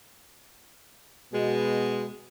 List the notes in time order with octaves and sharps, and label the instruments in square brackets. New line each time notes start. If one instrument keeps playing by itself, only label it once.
[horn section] B2 G#3